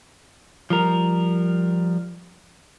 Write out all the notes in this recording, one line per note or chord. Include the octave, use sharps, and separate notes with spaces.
F3 G3 A#4